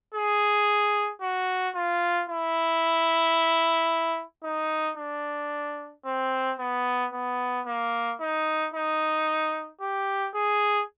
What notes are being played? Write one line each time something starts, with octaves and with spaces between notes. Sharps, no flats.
G#4
F#4
F4
E4
D#4
D4
C4
B3
B3
A#3
D#4
D#4
G4
G#4